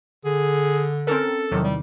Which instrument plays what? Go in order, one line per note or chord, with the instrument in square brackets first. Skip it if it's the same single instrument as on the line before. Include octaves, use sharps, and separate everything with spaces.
[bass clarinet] D3 [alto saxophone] G#4
[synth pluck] C4 C#4 A#4 [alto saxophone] A4
[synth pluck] E2 C3 D#3 [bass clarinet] F#3
[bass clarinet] G3